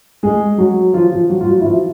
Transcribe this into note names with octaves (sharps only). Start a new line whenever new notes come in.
G#3 G#4
F#3 F#4
F3 F4
F3 F4
F#3 F#4
F4
F#3 F#4
E4
F3 F4